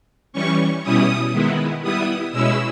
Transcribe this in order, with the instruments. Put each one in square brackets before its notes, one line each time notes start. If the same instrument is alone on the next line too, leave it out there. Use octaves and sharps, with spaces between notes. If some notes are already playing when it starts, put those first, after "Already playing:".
[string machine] E3 G3 C#4 C#6
B2 G3 C#4 E4 D#6
D#3 G#3 B3 E4
G3 B3 E4 D#6
B2 G#3 C#4 E4 E6